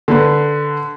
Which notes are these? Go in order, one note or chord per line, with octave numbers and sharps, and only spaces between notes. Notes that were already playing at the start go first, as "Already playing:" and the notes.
D3 B4